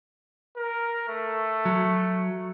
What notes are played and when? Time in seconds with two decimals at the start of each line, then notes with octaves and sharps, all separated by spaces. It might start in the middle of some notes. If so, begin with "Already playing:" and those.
0.57 A#4
1.08 A3
1.65 F#3